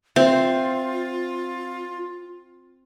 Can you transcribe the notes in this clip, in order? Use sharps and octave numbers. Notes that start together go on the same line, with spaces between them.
C4 F4 E5